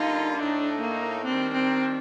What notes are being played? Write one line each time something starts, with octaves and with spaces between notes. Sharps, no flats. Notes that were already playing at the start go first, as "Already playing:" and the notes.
Already playing: D3 G3 A#3 D#4 F4
A2 A3 D4 D#4
A#3
D#3 G3 C4 D4
C4